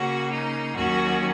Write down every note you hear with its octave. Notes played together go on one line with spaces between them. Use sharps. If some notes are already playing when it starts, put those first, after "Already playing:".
Already playing: C#3 A#3 C#4 F#4
D#4
D#2 D#3 F#3 C#4 F#4